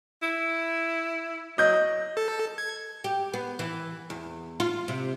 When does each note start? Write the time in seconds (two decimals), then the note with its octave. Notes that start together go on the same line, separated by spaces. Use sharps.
0.22 E4
1.58 F#3 D#5 G6
2.17 A4
2.58 G#6
3.04 G4
3.34 B3
3.59 E3
4.10 E2
4.60 F4
4.88 C3